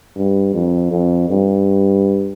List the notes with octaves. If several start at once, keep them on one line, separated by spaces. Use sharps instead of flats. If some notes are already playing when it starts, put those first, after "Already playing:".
G2
F2
F2
G2